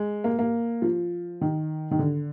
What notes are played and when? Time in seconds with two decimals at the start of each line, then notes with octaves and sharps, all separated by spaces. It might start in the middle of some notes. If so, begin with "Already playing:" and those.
Already playing: G#3
0.24 A#3
0.39 A#3
0.82 F3
1.41 D#3
1.91 D#3
1.99 D3